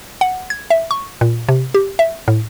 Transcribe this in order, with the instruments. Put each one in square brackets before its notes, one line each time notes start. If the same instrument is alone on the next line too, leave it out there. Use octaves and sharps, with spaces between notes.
[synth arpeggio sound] F#5
G#6
E5
C#6
A#2
C3
G4
E5
A2